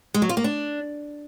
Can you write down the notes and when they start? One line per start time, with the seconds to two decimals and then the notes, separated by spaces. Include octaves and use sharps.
0.14 G#3
0.22 F#3
0.29 F4
0.37 A#3
0.44 D4